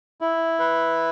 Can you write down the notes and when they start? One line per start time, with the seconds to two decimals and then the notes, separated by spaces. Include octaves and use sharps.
0.21 E4
0.59 B4